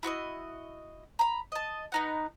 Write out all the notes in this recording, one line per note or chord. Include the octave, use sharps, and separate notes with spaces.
E4 F#4 C5 D#5
A#5 B5
D#5 A5
B3 D#4 F#5